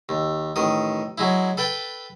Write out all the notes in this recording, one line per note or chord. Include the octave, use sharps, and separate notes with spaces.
D#2
A1 D#3 D#6
F#3 G#3 E4
A4 B4 G5 A5